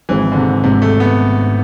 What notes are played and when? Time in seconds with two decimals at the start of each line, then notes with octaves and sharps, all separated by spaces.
0.09 G#1 G#2 E3 F3 G#3 C4
0.32 D3
0.37 C3
0.64 G#1 G#2 C3 F3 G#3 C4
0.82 A3
1.00 B3